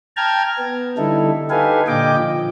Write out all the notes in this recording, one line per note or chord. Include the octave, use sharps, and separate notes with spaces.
G5 A5 A#5 F6 G#6
B3
D3 G3 D#4 E4 A4
D#4 G4 A4 B4 F5 G#5
A#2 D3 D#5 G5 D6
F3